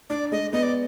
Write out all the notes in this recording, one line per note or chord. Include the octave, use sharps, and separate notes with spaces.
D4 D5
G#3 D#5
B3 D#5
D5